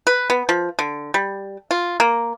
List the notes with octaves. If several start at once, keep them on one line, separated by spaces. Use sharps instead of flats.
B4
B3
F3
D3
G3
F4
A#3